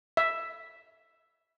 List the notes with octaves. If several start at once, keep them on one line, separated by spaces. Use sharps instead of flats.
E5